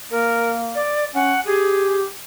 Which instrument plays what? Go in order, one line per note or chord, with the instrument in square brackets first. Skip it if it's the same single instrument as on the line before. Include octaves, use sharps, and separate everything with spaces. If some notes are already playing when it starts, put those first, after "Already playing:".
[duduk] A#3 [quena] A#4
[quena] D5
[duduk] C#4 [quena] F#5
[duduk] G4 [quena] G#4